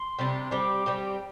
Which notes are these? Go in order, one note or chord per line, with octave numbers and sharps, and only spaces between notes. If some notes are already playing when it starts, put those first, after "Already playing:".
Already playing: C6
C3 G3 D4 G4
G3 C4 G4 D6
G3 C4 G4